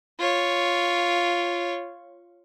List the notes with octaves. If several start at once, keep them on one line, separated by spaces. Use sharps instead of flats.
F4 C#5